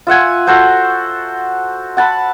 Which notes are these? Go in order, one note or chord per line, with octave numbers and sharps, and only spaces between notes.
F4 E5 F#5 G#5
F#4 A4 C5 F#5
F#5 A5 B5